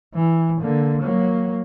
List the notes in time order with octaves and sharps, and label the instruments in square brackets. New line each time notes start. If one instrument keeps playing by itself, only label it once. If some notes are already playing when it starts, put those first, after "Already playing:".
[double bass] E3
D3 A#3
F#3 A#3